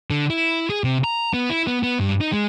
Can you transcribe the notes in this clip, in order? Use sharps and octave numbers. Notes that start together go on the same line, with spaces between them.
D3
E4
G#4
C3
A#5
B3
E4
B3
B3
G2
D#4
G#3